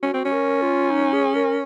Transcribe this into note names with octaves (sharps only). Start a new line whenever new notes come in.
C#4 F#4
C4
C#4
A#4
F4
D#4
G#4
A#4